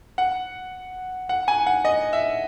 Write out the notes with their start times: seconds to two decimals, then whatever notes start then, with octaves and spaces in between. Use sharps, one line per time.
0.18 F#5
1.29 F#5
1.48 G#5
1.67 F#5
1.85 D#5
2.13 E5